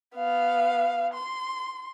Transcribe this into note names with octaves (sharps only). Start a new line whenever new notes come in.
B3 F5
C6